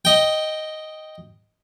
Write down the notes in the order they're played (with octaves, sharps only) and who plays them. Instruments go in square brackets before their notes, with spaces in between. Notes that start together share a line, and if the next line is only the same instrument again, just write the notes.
[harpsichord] D#5 G5